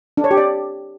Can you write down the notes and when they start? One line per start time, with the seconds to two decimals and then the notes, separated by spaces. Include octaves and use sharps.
0.17 D4
0.24 C#5
0.31 G4
0.37 D5